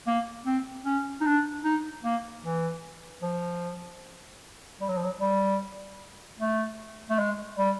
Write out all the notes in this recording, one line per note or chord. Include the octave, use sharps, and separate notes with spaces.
A#3
C4
C#4
D#4
D4
D#4
A#3
E3
F3
G3
F#3
F3
F#3
G3
A3
A3
G#3
G3